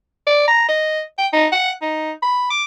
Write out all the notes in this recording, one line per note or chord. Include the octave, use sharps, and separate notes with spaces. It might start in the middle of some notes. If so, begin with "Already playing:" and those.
D5
A#5
D#5
G5
D#4
F#5
D#4
B5
D6